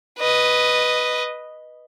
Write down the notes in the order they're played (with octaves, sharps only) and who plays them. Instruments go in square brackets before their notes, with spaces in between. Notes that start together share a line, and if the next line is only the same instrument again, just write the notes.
[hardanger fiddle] B4 D#5